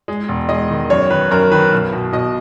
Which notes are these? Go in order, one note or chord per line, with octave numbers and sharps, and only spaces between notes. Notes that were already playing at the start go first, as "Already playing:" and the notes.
G#3
E1
G#3 D#5
D#3
F#2 C#5
D#3 B4
F#2 A#4
D#3 B4
B1
B2
B2 D#5